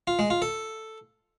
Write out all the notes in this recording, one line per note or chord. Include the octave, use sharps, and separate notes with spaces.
F4
G#3
F4
A4